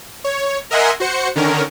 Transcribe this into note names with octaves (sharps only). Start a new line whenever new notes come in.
C#5
A#4 D#5 E5 F#5 G#5 C6
F#4 C5 C#7
D3 D#3 C#4 A#4